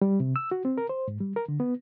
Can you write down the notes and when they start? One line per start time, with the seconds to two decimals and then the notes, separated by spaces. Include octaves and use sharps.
0.02 G3
0.20 C3
0.36 E6
0.51 F#4
0.65 C4
0.78 A#4
0.89 C5
1.08 G#2
1.20 G3
1.36 A#4
1.48 D3
1.60 B3